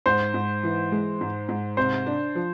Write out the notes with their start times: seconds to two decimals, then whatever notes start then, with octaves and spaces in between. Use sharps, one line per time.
0.06 G#2 C5
0.34 G#2
0.63 E3
0.92 G#3
1.21 G#2
1.49 G#2
1.77 C3 C5
2.06 D4
2.35 F3